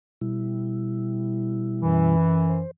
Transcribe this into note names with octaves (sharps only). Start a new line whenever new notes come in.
B2 G3 E4
F#2 E3
C5